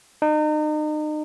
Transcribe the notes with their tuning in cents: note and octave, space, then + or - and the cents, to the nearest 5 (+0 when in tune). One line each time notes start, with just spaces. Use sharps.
D#4 -35